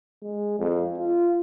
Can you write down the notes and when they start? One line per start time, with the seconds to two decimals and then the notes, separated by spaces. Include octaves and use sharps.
0.23 G#3
0.59 F2
0.97 F4